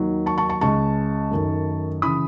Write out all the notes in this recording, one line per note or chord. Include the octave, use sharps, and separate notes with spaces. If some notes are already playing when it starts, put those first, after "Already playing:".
Already playing: D#2 D#3 F#3
A5 C#6
A5 C#6
A5 C#6
C#2 C#3 G#3 A5 C#6
F#2 D#3 A3
C#3 E3 B5 D#6